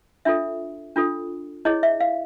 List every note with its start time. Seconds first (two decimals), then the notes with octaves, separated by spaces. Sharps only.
0.25 D4 F4 A4 E5
0.96 D4 F4 A4
1.65 E4 G#4 C#5 D#5
1.83 E5
2.01 F5